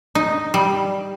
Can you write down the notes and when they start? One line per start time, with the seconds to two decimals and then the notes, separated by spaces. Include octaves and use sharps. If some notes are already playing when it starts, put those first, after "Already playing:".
0.15 D#4
0.54 G3